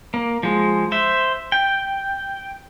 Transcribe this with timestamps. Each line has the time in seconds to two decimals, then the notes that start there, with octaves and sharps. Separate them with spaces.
0.14 A#3
0.43 F3 G#3
0.92 C5 E5
1.52 G5